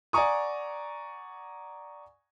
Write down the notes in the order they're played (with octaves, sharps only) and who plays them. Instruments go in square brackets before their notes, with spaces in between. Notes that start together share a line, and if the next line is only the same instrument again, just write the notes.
[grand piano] D5 F#5 G#5 A#5 C#6 D#6